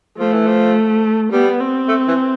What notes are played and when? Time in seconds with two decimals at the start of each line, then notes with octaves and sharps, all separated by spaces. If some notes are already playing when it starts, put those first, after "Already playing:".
0.18 F3 A3
0.32 E3
0.46 F3
1.32 G3 B3
1.60 C4
1.88 A3
2.08 E3